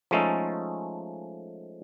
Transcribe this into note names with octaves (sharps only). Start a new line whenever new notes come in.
F3 G#3 A3 C#4 D#4 A4